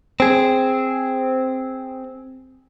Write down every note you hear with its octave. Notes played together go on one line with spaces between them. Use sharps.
C4 G#4